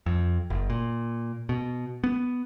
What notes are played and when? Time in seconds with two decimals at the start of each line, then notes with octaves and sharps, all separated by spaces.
0.06 F2
0.50 F#1
0.70 A#2
1.49 B2
2.04 B3